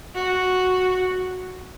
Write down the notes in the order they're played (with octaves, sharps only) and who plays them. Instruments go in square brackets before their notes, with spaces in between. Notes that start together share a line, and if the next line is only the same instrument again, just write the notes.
[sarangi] F#4